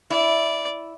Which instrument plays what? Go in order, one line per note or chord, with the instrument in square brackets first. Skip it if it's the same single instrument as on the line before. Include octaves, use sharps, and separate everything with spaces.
[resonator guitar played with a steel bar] E4 [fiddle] D5